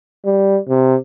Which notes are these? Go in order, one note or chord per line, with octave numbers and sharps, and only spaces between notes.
G3
C3